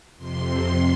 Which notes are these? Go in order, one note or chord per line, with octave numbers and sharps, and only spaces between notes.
F2 C3 C6